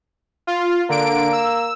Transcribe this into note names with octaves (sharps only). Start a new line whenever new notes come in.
F4
D3 A#3 D7
E6